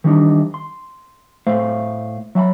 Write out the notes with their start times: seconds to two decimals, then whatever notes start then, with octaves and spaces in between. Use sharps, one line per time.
0.04 D#3 E3 G3 D4 D#4
0.54 C6
1.47 A2 A3 C5 E5 F5
2.35 F#3 E5 A5 B5